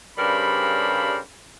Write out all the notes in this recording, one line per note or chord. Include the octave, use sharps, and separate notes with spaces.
G2 C#3 G3 A#4 C5 B5